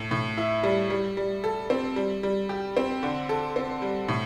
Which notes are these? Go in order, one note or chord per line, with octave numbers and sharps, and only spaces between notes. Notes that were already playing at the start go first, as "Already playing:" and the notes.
Already playing: A2
A2
E4
G3
G3
G3
A4
C4
G3
G3
G4
C4
D3
A4
C4
G3
A2